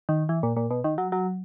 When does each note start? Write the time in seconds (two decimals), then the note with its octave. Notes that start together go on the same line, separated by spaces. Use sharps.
0.09 D#3
0.29 E3
0.43 A#2
0.57 A#2
0.71 B2
0.84 D#3
0.98 F#3
1.12 F#3